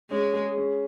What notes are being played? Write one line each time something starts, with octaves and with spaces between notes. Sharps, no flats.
G#3 C#4
G#4
C#4